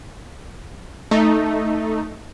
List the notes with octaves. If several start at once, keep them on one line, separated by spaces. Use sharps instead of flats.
A3 D#4